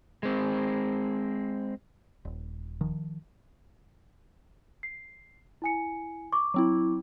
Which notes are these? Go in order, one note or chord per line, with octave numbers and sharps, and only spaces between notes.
G#3 C4
D#1
D#3 F3
C7
E4 G#5 C#7
C#6 D6
F#3 C4 E4